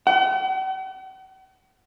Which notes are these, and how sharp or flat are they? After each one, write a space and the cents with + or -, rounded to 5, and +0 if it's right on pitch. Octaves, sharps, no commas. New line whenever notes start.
F#5 +45